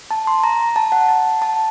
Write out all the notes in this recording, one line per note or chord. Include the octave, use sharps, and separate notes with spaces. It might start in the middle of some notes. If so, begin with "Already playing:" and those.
A5
C6
A#5
A5
F#5
A5
A5